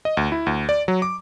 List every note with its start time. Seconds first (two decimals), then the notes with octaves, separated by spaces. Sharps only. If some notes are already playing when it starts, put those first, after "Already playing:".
0.05 D#5
0.17 D2
0.32 E4
0.46 D2
0.69 D5
0.88 F#3
1.02 D6